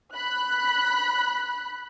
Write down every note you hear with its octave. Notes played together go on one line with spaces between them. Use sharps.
B5 F#6